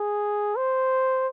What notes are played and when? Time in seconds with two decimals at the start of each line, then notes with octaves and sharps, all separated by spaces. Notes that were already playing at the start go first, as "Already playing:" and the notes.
Already playing: G#4
0.57 C5